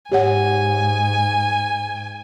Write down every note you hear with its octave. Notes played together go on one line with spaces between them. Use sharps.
G#2 G4 C#5 F#5 G#5